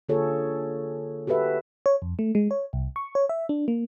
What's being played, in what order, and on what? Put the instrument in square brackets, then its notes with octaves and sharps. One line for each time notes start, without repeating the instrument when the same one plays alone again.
[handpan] D3 A#3 F4 G#4 A4 C#5
F#4 G4 A4 B4 E5
[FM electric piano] C#5
F2
A3
G#3
C#5
C2
C#6
C#5
E5
D4
A#3